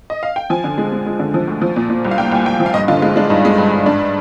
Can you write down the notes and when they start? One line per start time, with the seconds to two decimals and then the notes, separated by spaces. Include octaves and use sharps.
0.10 D#5
0.23 F5
0.36 G5
0.50 F3 G#5
0.64 D3
0.78 G#3
0.92 G#3
1.06 G#3
1.20 D3
1.34 F3
1.48 D2
1.62 F3
1.76 A#2
1.90 A#2
2.05 C2
2.11 F5
2.18 C2 G5
2.32 C2 G#5
2.46 C2 G5
2.60 F3
2.66 F5
2.74 G2 D#5
2.88 D3 F4
3.02 G#3 F4
3.16 G#3 D4
3.30 G2 D#4
3.45 G#3
3.58 G2
3.72 G2
3.86 G#2 D4